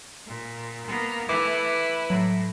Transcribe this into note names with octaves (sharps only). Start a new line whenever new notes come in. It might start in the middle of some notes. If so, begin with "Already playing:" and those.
A#2
A#3 B3
E3 A3 E4 B4 D6
A2 F#3